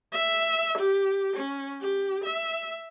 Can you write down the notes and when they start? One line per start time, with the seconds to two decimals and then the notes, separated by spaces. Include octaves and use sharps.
0.13 E5
0.78 G4
1.36 C#4
1.81 G4
2.24 E5